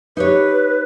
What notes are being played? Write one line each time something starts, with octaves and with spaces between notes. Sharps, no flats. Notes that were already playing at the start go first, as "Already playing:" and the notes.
D#4 G4 B4 C#5